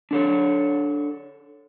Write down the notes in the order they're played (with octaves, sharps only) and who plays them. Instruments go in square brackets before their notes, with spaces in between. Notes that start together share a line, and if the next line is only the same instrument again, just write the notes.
[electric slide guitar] D4 A4 C#5